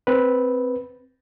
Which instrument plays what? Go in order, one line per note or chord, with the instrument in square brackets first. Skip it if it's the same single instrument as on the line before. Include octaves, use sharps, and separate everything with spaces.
[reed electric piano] C4 B4